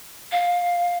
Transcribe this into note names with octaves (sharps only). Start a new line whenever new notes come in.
F5